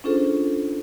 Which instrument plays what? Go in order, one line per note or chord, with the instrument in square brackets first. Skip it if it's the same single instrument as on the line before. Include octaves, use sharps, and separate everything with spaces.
[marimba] C#4 D4 F4 G#4 A4 C5